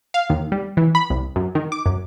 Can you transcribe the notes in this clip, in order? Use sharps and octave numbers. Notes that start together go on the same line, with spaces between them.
F5
D#2
G3
E3
B5
C2
F#2
D#3
D6
F#2